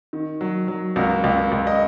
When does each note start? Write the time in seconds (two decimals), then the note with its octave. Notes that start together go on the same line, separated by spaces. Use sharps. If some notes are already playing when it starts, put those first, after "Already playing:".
0.13 D#3
0.41 F#3
0.68 F#3
0.96 C#2 F#4 A#4
1.24 C#2
1.52 C#2
1.67 D#5